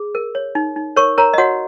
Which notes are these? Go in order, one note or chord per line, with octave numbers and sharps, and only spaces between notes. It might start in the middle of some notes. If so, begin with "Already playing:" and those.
Already playing: G#4
A#4
C#5
D#4
D#4
A#4 C#5 C#6
A#4 C#5 A#5
D#5
F#4 C#5 F#5